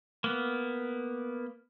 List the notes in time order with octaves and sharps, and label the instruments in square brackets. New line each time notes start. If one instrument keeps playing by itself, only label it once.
[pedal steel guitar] A#3 B3